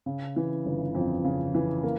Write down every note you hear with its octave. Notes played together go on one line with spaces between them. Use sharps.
C#3
E3
G1
F2
C#3
E3
A#3